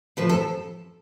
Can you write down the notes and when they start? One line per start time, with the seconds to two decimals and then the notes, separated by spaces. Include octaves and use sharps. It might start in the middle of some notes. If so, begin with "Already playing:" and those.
0.17 A2 F3 B4
0.29 A4